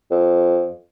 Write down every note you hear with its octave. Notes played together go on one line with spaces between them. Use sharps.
F2